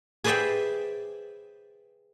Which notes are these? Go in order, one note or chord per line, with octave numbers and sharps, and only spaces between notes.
G#4 B4 C5 D5 E5 G5